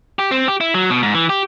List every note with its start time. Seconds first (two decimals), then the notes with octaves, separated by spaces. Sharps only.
0.19 G4
0.31 C4
0.48 G4
0.61 E4
0.74 F#3
0.90 B2
1.03 G#2
1.14 E3
1.29 G4